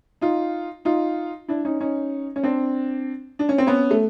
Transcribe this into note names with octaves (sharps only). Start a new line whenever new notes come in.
D#4 F4
D#4 F4
D4 E4
C#4 D#4
C#4 D#4
C#4
C4 D4
D4
C#4
C4
B3 C#4
A3